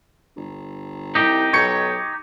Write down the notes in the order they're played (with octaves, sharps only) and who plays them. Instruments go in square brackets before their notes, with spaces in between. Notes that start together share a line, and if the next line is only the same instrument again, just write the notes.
[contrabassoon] G1
[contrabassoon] C2 [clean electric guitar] D#4 G4
[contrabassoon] B1 [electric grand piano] C#6 G#6 C#7